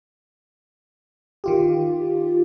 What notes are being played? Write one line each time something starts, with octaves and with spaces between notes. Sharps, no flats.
D#3 F4 G4